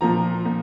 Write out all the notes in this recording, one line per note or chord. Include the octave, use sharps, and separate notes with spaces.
A#2 F3 A#5
A#2